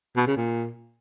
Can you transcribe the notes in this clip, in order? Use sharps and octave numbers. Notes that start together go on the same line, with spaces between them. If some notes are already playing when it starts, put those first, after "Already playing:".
B2
C#3
A#2